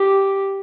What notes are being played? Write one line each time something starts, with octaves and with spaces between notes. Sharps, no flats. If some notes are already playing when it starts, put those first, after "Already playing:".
Already playing: G4